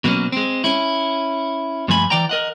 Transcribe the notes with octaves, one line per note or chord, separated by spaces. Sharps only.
B2 F#3 A#3 C4 C#4
G#3 C4
C#4 E4
G2 F3 A3 G#5 B5
E3 D5 G5 A#5
A#4 D#5 F#5